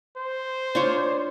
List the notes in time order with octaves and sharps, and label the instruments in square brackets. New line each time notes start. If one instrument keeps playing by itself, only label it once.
[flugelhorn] C5
[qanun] D4 F4 C#5